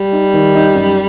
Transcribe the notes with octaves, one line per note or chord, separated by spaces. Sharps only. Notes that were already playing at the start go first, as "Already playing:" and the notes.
Already playing: G3
D#4
D#3
D#4
F#2